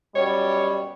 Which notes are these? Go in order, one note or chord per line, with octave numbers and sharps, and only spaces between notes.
F#2 B2 G3 C#5